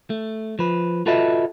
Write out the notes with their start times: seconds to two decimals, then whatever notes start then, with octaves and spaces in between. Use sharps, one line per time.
0.10 A3
0.59 F3 B4
1.06 F4 F#4 A4 B4 D#5 E5